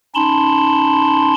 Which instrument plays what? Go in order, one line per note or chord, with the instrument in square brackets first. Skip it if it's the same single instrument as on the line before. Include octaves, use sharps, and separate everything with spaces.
[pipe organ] C#4 D#4 A5 B5 C6